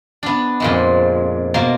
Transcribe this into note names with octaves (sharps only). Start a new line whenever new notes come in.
B3 D4
F2 A#2 G#3
B2 A#3 C6